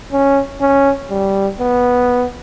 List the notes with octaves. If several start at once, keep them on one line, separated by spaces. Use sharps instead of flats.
C#4
C#4
G3
B3